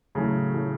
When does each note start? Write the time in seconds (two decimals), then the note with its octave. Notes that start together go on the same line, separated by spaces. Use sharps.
0.15 A2 C#3 F#3 A3
0.54 A2 F#3 A3